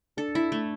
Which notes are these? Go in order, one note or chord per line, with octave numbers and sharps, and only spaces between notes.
D4 A4
E4
A3